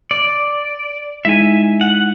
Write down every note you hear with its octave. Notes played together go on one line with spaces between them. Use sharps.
D5
G#3 D#4 E4 E5 G#5
F#5